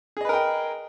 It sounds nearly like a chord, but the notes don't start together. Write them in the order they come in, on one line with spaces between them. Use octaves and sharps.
G#4 D#5 B4 A#4 G5